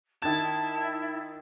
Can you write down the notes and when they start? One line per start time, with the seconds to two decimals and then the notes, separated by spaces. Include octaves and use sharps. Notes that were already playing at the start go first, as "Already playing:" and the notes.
0.22 D#3 E4 A5 G#6